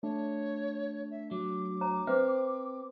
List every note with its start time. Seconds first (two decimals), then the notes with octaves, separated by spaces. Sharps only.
0.03 A3 D4 C#5
1.11 E5
1.31 F#3 D6
1.81 C#5 A#5
2.07 C4 B4 C5 E5